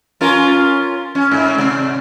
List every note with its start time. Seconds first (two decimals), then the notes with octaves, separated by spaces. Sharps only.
0.21 C#4 F4 A#4
1.15 C#4
1.32 G#2
1.58 C3